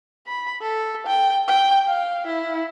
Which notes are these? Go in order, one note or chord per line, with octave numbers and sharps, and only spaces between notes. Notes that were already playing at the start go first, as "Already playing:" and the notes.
B5
A4
G5
G5
F5
E4